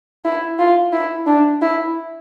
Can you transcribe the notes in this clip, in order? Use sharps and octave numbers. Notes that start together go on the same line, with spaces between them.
E4
F4
E4
D4
E4